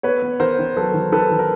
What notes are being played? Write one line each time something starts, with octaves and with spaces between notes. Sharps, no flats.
B3 B4 C#5
B3
D#3 A#4 C5
D#3
F#3 A4 B4
D#3
D#3 A4 B4
D#3
A#4